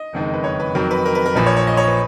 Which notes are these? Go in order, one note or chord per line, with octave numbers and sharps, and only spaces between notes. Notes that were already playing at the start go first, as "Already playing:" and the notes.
Already playing: D#5
F#1 F2 D#3 G#3
B4
C#5
B4
F2 D#3 F#3 A#4
B4
A#4
B4
A#4
A#1 A#2 F3 B4
C#5
C#5
D#5
C#5
B4